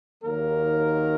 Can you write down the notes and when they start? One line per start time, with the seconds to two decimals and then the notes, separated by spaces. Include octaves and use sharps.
0.23 D#2 D#3 F#3 A#3 A#4